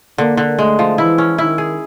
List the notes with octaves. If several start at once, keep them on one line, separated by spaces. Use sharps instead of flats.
D3 A#3
D3
G#3 A3
F3
E3 E4
C#4
D#3 E4
G#4